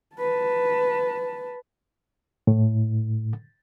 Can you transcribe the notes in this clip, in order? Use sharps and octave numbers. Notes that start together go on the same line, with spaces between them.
B4 A5
A2